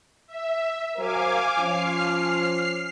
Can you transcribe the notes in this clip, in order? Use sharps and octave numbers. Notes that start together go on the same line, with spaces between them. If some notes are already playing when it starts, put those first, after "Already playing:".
E5
F#3 A#4 C5 F5 G#5 D6
F3 C#4 F6 C7